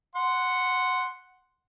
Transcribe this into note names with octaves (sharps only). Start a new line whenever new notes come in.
F#5 C6